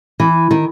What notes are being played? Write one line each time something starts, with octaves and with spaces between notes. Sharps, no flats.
E3
D#3